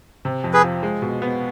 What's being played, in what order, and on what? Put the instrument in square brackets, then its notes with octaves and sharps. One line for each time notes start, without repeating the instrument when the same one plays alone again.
[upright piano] C3
F2
[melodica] G#4 B4
[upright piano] F3
G#3
B2
B3